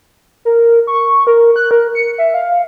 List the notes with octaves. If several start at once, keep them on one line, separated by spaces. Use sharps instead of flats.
A#4
C#6
A#4
F#6
A#4
C#7
E5
F5